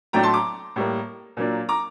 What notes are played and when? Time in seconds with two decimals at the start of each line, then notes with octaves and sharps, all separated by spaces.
0.13 A2 F#3 A3 D4 G5 A#5
0.23 A5 C6
0.34 A#5 D6
0.76 A2 G3 A#3
1.37 A#2 F#3 A#3 D4
1.69 A#5 D6